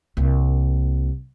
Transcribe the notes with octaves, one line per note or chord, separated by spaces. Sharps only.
C2 A#3